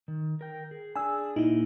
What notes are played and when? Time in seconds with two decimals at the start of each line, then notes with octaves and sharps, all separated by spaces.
0.08 D#3
0.41 A#4 G5
0.71 G#4
0.96 D4 G#4 G#5 E6
1.36 A#2 A#3 D#4 E4